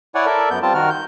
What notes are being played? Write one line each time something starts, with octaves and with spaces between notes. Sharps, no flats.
E4 C#5 D5 F#5 G#5
A4 A#4 D5 E5
F#2 B3 G6
G3 C4 F4 A5
D#3 F#4 A#4 F6
G6